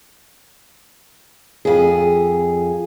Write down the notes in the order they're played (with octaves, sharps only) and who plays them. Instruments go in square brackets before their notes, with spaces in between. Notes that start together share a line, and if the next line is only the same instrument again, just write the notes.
[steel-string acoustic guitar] F2 G#4